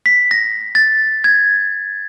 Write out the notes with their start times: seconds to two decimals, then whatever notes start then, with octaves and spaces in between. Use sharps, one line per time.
0.06 B6
0.31 A#6
0.75 A6
1.24 G#6